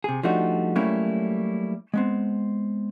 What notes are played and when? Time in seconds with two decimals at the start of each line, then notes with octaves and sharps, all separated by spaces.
0.04 C3 G#4
0.23 F3 G3 A3 D4 D#4 F#4
0.76 F#3 G3 A3 A#3 C#4 E4
1.94 G#3 B3 C4